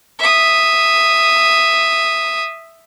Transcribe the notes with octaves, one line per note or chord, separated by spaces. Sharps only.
E5 D#6